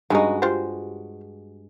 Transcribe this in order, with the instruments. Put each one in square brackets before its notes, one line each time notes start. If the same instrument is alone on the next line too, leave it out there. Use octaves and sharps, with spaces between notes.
[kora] G2 G#3 F#4 [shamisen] C#3 D#4
[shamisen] F4 G4 C5